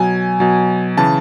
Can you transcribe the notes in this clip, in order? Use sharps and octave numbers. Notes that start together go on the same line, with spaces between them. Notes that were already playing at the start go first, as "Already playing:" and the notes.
Already playing: B2 F#3 G#5
B2 F#3
C#3 E3 A5